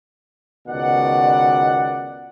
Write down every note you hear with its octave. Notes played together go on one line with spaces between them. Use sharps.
C#2 B2 D#3 D5 F#5